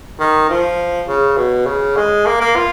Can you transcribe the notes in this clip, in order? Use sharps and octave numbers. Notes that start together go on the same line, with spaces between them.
D#3
F3
C#3
B2
C#3
G#3
A#3
A#3
F4